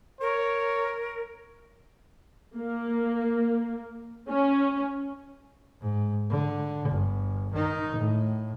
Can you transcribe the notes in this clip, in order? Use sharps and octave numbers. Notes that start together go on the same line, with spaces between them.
A#4 C#5
A#3
C#4
G#2
D3
G1
D#3 D#4
A2